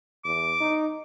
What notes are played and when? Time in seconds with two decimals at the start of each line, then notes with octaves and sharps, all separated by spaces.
0.25 E2 D6
0.61 D#4